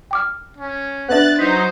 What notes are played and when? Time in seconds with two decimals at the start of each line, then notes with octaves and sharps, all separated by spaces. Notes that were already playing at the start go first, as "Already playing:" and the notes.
0.11 G5 D6 F6
0.57 C#4
1.09 B3 D4 E5 F#5 F#6 A6
1.39 F#3 D#4 C5 B6